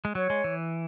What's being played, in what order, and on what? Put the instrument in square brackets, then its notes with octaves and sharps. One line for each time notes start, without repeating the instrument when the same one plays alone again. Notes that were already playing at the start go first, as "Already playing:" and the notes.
[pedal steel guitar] G#3
[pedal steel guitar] F#3 [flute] C#5
[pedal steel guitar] G#3
E3